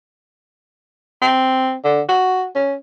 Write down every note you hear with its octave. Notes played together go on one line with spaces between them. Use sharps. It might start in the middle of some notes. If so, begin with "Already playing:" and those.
C4
D3
F#4
C#4